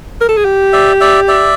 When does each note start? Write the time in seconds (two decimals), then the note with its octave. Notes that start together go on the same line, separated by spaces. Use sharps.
0.21 A#4
0.29 A4
0.37 G#4
0.45 G4
0.73 D5 E5
1.01 D5 E5
1.28 D5 E5